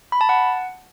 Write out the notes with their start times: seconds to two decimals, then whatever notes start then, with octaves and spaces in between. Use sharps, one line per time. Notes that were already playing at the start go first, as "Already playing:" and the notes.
0.12 B5
0.21 A5
0.29 F#5